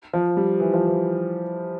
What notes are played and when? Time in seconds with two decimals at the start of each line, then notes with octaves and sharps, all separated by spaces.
0.14 F3
0.37 G3
0.60 E3
0.74 F3
0.87 E3